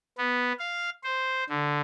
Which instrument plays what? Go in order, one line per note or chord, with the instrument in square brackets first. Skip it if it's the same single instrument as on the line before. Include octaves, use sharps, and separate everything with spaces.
[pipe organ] B3
F5
C5
D3